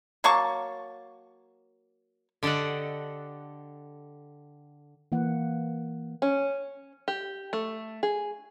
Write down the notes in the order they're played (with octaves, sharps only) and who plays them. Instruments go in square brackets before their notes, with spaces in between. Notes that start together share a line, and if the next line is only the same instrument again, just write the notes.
[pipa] F#3 A#3 A5 C#6
[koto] D3 G4 A4 D#5 F#5
[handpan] E3 A#3 F#5
[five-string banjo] C#4
G4
A3
G#4